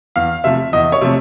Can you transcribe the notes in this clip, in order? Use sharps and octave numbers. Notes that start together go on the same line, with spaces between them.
E2 F5
C3 F3 A3 E5
E2 D#5
C#5
C3 F3 A3